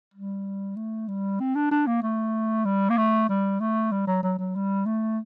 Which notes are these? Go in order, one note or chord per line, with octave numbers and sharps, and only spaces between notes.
G3
A3
G3
C4
D4
D4
A#3
A3
G3
A#3
A3
G3
A3
G3
F#3
F#3
F#3
G3
A3